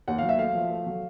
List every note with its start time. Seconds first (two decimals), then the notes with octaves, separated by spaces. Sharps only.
0.08 D#2 F#5
0.18 F#3 F5
0.29 E5
0.39 A3 F5
0.55 F3
0.71 A3
0.86 F#3